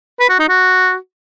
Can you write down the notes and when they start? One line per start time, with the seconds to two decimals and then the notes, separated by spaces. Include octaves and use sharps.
0.20 B4
0.29 F#4
0.39 D#4
0.49 F#4